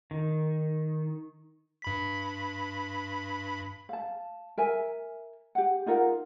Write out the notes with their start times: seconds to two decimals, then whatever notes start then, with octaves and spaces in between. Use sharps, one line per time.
0.11 D#3
1.82 G2 B5 B6
3.89 F5 A5
4.58 A#4 E5 G#5
5.55 G4 F#5
5.86 D#4 F4 A#4 F#5